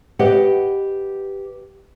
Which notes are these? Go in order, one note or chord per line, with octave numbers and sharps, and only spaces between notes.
G4 B4 D#5 F#5